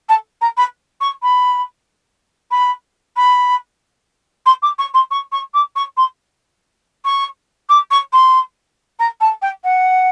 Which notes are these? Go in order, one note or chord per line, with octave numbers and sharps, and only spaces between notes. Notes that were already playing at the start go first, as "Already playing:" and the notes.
A5
A#5
B5
C#6
B5
B5
B5
C6
D6
C#6
C6
C#6
C#6
D6
C#6
C6
C#6
D6
C#6
C6
A#5
A5
G5
F#5